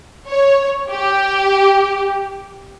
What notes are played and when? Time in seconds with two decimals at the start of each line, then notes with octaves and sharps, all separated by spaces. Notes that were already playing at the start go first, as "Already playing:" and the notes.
0.28 C#5
0.90 G4